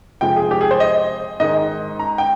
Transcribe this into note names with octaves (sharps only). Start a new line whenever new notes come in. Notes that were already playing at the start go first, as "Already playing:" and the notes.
F2 C3 F3 G#3 G5
G#4
G4
G#4
C5
D#5
G#2 D#3 G#3 D#5
A#5
G5